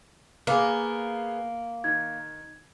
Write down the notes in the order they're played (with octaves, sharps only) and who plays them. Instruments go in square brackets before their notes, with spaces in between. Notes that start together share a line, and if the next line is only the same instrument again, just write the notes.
[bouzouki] A#3 [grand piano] B3 G#4
[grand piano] D#3 [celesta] G#6